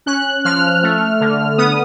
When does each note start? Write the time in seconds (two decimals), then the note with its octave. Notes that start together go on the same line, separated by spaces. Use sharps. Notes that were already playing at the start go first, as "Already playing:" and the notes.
0.06 C#4 F#6
0.44 F3 F6
0.83 A3
1.20 D3
1.58 B3 D#6